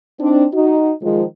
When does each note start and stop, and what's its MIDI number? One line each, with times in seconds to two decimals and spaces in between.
0.20 0.44 60
0.20 0.44 62
0.20 0.44 63
0.53 0.91 63
0.53 0.91 66
1.02 1.22 51
1.02 1.22 53
1.02 1.22 56